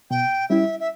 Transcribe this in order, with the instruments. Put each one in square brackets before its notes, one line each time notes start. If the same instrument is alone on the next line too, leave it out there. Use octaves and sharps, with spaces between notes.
[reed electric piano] B2 [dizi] G5
[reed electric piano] G3 C#4 E4 [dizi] E5
[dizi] E5